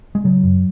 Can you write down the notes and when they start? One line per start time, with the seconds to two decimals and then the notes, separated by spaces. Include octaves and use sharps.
0.15 G#3
0.24 C#3 F#3
0.43 F#2